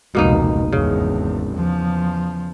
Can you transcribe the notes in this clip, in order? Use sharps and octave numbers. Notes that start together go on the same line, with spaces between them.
F1 C#2 B2 A#3 D#4
G#1 E2 C#3
E2 F3